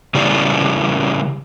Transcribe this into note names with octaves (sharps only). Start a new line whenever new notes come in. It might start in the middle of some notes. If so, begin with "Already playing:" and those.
C#3 E3 G3 D5